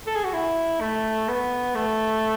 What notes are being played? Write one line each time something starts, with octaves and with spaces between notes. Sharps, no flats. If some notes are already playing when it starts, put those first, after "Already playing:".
A4
G#4
F#4
E4
A3
B3
A3